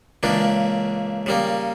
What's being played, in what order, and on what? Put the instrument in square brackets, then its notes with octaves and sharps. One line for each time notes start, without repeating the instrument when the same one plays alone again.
[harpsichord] C#2 C#3 E3 A#3 D4
C#3 G3 A#3